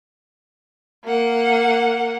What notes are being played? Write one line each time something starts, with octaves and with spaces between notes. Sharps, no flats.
A#3 F#5